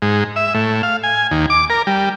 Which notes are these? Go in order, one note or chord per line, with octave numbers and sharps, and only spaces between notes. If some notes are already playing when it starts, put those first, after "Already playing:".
G#2
E5
A2
F5
G#5
D#2
D6
A#4
G3